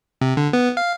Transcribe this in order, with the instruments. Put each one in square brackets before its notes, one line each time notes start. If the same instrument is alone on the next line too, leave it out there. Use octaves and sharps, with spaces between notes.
[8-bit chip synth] C3
D3
B3
F5